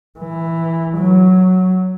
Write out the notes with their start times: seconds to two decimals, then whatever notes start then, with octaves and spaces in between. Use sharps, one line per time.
0.20 E3
0.97 F#3